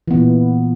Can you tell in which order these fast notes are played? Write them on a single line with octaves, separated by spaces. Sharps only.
E3 B3 A#2 E4